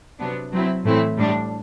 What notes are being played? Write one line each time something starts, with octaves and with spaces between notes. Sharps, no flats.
C3 F#3 B3 D4
F#3 C4 E4
A2 E3 A3 C4 E4
A2 G3 D4